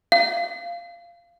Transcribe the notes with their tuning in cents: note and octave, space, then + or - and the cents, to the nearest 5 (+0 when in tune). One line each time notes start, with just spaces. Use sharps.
F5 -15